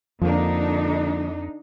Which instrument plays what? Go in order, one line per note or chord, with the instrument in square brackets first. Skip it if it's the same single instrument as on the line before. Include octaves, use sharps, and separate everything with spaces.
[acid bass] F2 [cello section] D3 D4 D#4 [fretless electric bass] F3 A#3